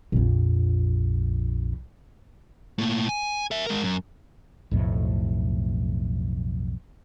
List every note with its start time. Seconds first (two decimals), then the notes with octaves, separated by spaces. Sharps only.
0.12 A#1 F2
2.78 A2 A#3
3.09 G#5
3.51 A#4 E5
3.67 G#3 A#4
3.82 F#2
4.71 B1 F2 A2 A3